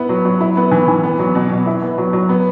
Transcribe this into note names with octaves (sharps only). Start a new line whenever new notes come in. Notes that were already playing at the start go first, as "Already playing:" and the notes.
Already playing: B3 E4
F#3
F#3
E4
B3
E3
E3
B3
F#3
B2
B2
E4
B3
F#3
F#3
B3